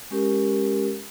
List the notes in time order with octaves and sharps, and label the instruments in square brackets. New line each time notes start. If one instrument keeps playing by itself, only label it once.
[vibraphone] G#3 C#4 G4 A#4